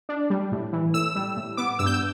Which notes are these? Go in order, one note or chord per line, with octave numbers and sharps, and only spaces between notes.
D4
G3
A2
E3
A2 E6
G3
A2
B3 D6
G2 E6
G6
E6